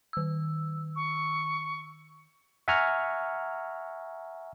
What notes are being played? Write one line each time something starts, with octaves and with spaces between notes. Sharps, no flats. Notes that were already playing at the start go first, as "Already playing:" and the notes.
D#3 E6
C#6
E5 F#5 G#5 A#5 C#6 F6